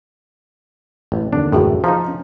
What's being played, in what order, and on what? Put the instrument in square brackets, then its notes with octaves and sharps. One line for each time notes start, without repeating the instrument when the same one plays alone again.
[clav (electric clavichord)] A1
[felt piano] D#2 D3 [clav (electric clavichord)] D4
[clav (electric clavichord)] A1 F#2 A2 [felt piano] F#4 G#4 E5
[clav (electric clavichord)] F3 D#4 [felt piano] F5 A#5
[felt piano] C#4